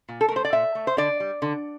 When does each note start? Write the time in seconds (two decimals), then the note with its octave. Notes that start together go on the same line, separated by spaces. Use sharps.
0.09 A#2
0.21 A4
0.28 A#4
0.31 A3 C5
0.45 D5
0.53 A#2 E5
0.75 A3
0.87 C5
0.97 D3 D5
1.20 G3
1.42 D3